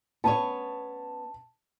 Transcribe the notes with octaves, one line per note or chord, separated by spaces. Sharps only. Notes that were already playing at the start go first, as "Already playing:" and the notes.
B3 C#4 C#5 A5